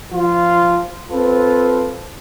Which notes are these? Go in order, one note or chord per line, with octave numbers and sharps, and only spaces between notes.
F3 F4
C4 F4 A4 B4